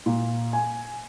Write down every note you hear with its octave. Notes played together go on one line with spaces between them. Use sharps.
A#2
G#5